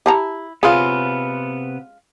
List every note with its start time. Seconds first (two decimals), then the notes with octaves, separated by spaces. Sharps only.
0.06 E4 G4 A5 A#5
0.63 C3 G#3 B3 C#4 F4 G#4